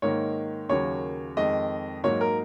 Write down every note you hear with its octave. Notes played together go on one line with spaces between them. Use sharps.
G#2 D#3 A#3 C#5
D#2 C#3 F#3 A#3 C#5
F2 D#3 G#3 D#5
G#2 F#3 A#3 C#5
A#4